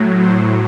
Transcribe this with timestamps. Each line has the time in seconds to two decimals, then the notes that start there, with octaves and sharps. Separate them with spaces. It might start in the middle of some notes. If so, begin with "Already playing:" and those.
Already playing: A2 F#3
0.16 C5